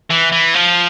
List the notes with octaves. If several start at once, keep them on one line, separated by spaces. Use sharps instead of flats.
E3
E3
F3